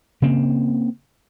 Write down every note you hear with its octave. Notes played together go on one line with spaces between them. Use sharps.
C#3 A#3 C4